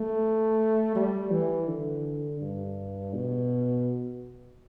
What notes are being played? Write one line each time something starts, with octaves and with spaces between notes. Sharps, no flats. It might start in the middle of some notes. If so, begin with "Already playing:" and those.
Already playing: A3
G3
E3
D3
G2
B2